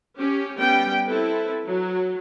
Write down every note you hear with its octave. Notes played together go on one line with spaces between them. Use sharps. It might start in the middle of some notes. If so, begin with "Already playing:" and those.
C#4 G4
G3 B3 C#4 G5
C4 E4 A4 B4
F#3